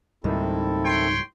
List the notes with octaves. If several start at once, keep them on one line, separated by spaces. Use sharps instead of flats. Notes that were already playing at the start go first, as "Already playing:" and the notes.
C#2 G#2 D#3 G3 C4 E4 A4
C#5 G5 C6